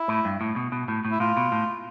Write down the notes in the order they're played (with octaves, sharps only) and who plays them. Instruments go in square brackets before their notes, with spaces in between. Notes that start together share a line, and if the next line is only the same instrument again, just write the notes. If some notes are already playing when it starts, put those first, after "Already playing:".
Already playing: [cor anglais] E4
[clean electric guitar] A2
G2
A2
B2
B2
A2
A2
[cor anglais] E4
[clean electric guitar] A2 [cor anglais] F4
[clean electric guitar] B2
A2